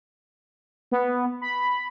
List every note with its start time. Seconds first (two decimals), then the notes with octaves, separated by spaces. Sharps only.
0.92 B3
1.41 B5